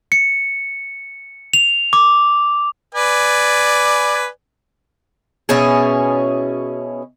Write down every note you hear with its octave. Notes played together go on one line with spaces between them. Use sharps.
C#7
F7
D6
B4 D5 G#5
B2 C#4 E4 G#4